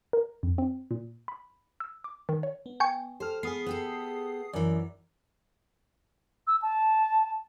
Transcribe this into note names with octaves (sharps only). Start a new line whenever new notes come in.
A#4
F2
C4
A#2
B5
E6
D6
D#3
C#5
B3
G5 G#5 C#6
G4 A4 C5 F6
B3 G#4 D#6 C7
B3 G4 A4
F#2 E3 A#4 D5
E6
A5